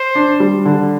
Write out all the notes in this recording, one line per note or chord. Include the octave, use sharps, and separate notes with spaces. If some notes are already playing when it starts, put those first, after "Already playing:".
Already playing: C5
D4
G3
D3